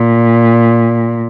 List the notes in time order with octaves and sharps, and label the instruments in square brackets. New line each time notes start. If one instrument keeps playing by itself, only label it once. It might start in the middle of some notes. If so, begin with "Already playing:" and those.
Already playing: [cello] A#2